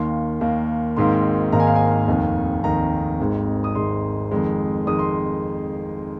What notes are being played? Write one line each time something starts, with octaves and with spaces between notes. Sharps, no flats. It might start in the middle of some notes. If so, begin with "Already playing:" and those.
Already playing: D#2 D#3 A#3 C6
D#2 D#3 A#3
G#1 G#2 D#3 A#3 C6
G#1 G#2 D#3 A#3 A#5
G#5
F5
G#5
F1 D#2 D#3
F1 D#2 D#3 A#5
G#1 G#2 G#3
D#6
G#1 G#2 G#3 C6
F2 D#3 G#3
F2 D#3 G#3 D#6
C6